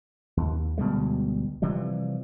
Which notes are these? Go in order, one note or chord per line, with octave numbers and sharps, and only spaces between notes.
D#2
D2 B2 G3 G#3
C3 E3 F3 G3